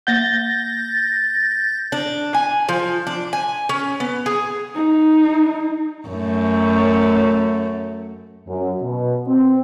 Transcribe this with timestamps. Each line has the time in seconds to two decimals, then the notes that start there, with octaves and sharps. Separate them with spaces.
0.07 A#3 F#5 G6 A6 A#6
1.92 D4
2.35 G#5
2.69 F3
3.07 D4
3.33 G#5
3.69 C#4
4.00 B3
4.26 G#4
4.75 D#4
6.08 F#2 A3
8.48 F#2
8.83 B2
9.28 C4